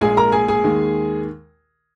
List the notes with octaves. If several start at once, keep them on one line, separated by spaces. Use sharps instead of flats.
A#1 A#2 G#3 G#4 G#5
A#4 A#5
G#4 G#5
G#4 G#5
D#2 D#3 G#3